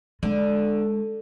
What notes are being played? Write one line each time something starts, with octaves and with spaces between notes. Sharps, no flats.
D3 G#3